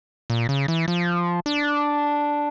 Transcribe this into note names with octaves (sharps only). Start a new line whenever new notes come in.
A#2
C#3
E3
F3
D4